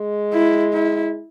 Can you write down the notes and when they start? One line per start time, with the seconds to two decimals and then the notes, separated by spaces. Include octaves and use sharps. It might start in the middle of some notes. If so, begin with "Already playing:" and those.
Already playing: G#3
0.33 E4
0.73 E4